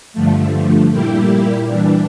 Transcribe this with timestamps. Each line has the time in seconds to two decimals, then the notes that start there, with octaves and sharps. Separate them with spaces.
0.13 G2 D3 F3 A3
0.91 A#2 G3 A#3 E4 G4
1.68 E3 G3 D4